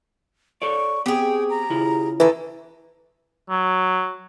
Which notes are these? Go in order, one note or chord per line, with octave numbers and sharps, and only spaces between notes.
A4 C#5 D5 C#6
B3 C4 G4 G#4 G5
A#5
C#3 E4 F4
D#3 E3 A4
F#3